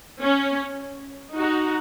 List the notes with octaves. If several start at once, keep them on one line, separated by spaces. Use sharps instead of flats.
C#4
D#4 F#4